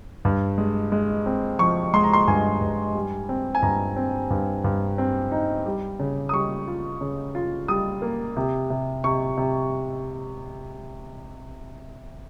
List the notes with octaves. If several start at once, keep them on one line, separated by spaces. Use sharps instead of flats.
G2
G#3
G#3
C4
F3 C#6
G#3 C6
A#5
C6
G2 G#5
G2
G3
C4
G#5
G2 A#5
C4
G2
G2
C4
D#4
G3
C#3
D#6
G3 C#6
F4
C#3
F4
G3 D#6
A#3
C3
C3
C3 C#6
C3